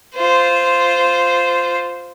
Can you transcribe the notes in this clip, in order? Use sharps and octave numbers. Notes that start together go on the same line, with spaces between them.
F4 C5